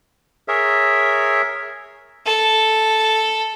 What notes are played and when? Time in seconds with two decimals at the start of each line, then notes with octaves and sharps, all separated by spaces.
0.48 G#4 A#4 C#5 E5
2.26 A4